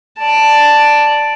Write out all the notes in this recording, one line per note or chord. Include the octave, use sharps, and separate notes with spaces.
D5 A5